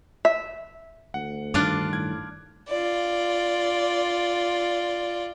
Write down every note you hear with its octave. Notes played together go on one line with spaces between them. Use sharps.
E5
D2 F#5
G2 D#3 D4 F4 D6 F6 F#6
A2 G#6
F4 D5